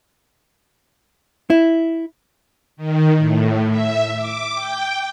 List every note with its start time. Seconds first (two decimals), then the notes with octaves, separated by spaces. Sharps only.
1.50 E4
2.77 D#3
3.17 A2
3.70 E5
4.16 D6
4.55 G5